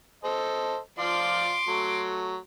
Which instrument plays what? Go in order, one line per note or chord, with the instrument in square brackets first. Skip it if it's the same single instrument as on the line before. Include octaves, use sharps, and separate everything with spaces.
[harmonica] A4 C5 D#5
[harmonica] F3 F4 D5 [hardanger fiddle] C6 D6
[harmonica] F#3 A3